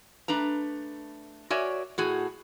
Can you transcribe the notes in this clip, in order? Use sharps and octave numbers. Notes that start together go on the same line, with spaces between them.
A3 D4 B4 A#5
F#4 A#4 C#5 D5 E5 G#5
A2 F#4 G#4